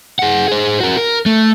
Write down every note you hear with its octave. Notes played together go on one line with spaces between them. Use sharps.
G#4 F#5
G#4 C5
F#4 A#4
A#4
A3